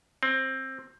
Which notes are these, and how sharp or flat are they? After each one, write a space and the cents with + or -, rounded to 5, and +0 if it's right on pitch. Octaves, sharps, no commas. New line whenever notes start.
C4 +15